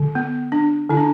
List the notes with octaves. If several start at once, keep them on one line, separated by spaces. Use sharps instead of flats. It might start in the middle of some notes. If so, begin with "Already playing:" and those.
Already playing: D3
B3
D4
D3 E4
D4